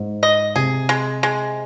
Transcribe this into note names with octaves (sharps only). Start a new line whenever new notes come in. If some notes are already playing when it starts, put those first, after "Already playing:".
Already playing: G#2
D#5
C3 G#4
G#3
G#3